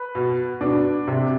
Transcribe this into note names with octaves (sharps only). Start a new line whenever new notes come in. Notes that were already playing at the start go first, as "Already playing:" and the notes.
Already playing: B4
B2
B2 D4
C3